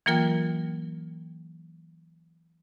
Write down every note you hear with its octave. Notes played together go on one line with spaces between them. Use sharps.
E3 F#3 A#3 F4 A#4 G5